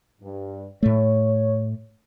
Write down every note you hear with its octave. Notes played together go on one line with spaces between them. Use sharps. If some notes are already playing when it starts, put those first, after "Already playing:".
G2
A2 A3 C#5